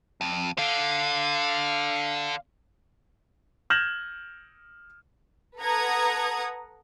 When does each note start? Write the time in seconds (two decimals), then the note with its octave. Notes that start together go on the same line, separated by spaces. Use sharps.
0.21 F2
0.58 D3 F5
3.70 F6 G6 G#6 A#6 E7 F#7
5.60 A4 B4 F#5 A#5 D#6 G#6